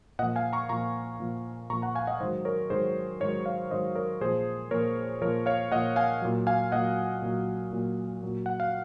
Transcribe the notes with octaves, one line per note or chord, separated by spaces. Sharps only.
A#2 F3 D#5 F#5
F5 G#5
A#5 C#6
A#2 F3 A#5 C#6
A#2 F3
A#2 F3 A#5 C#6
F#5 A#5
F5 G#5
D#5 F#5
G#2 D#3 F#3 C5 D#5
A#4 C#5
G#2 D#3 F#3 G#4 C5
G#2 D#3 F#3 A#4 C#5
C#5 F5
G#2 D#3 F#3 C5 D#5
A#4 C#5
A#2 F3 G#4 C5
A#2 F3 A#4 C#5
A#2 F3 A#4 C#5
C#5 F5
A#2 F3 D#5 F#5
F5 G#5
A#2 F#3
F5 G#5
A#2 F#3 D#5 F#5
A#2 F#3
A#2 F#3
A#2 F#3
F#5
F5